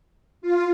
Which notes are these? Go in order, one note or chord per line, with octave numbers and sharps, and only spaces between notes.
F4